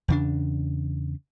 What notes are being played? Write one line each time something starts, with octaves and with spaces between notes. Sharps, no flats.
E2 C#3 D4